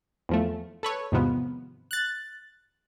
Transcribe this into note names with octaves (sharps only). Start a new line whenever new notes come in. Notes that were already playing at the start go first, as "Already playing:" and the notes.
E2 F3 A3
A4 B4 C#5
E2 G#2 C3 D#3 F3 B3
F#6 A6